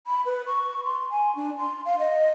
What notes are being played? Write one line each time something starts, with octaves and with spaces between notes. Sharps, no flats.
B5
B4
C#6
C6
G#5
D4
C6
F5
D#5